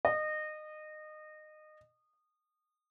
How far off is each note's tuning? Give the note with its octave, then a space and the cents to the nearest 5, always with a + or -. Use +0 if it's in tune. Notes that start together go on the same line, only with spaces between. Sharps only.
D#5 -25